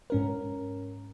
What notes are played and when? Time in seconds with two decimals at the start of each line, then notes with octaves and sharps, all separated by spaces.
0.10 G#2 C#4 A#4